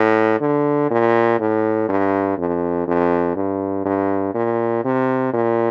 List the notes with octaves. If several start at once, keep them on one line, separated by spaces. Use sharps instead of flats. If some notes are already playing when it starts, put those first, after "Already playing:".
Already playing: A2
D3
A#2
A2
G2
F2
F2
G2
G2
A#2
C3
A#2